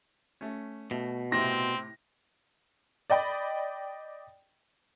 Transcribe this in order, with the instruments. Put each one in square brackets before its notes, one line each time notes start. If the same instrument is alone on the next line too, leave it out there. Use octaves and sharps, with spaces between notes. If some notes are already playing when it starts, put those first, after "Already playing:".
[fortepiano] A3 C#4
[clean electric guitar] B2 [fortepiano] A3
[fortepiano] A2 C3 E4 [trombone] C4 [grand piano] A#6
[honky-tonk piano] D5 D#5 G5 B5